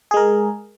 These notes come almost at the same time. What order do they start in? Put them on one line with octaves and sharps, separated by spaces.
G#4 G#3 A#4